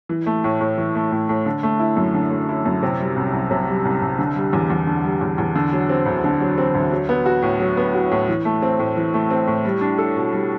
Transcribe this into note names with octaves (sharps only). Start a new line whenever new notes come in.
E3
A3
A2
A2
E3
A3
A2
A2
D3
A3
E4
F#2
D3
A3
E4
F#2
C3
G3
C2
C2
C3
G3
C2
C2
D3
G3
E2
E2
D3
G3
E2
E2
D3
F#3
C4
D2
D3
F#3
C4
D2
F#3
B3
F#4
A2
F#3
B3
F#4
A2
E3
A3
C4
A2
E3
A3
C4
A2
G3
D4
A4
B2
G3